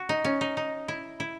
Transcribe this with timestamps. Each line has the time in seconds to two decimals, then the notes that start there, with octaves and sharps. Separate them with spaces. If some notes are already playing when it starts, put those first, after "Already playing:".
Already playing: F#4
0.09 D#4
0.24 C#4
0.41 D#4
0.57 D#4
0.88 E4
1.20 E4